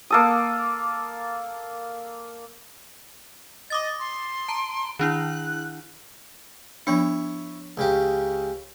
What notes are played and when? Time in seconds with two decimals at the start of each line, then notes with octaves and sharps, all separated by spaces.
0.10 A#3 A4 D#6
3.70 D#5 D6 D#6 A6
4.00 C6
4.48 A5 A#5 D7
4.99 D#3 D4 E4 F#6
6.87 F3 B3 D4 E4 C#5
7.77 C#2 C#3 G4